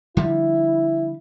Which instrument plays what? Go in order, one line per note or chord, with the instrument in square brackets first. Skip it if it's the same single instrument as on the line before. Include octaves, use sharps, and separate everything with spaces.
[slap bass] D3 F3 G3 [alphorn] E4